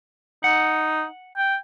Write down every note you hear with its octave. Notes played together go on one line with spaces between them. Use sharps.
D#4 F#5
G5